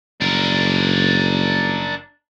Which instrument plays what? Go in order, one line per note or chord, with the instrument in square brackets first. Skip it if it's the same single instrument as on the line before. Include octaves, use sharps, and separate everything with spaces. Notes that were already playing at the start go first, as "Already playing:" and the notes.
[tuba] F#1 [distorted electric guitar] D4 A#4